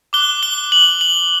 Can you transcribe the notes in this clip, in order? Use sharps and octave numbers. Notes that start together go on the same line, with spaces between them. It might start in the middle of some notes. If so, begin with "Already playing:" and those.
D6 F#6 G7
G7
F#7
F#7